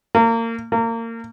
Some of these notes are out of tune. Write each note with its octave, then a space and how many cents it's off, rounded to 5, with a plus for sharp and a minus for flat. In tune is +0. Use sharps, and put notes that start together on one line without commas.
A#3 -30
A#3 -30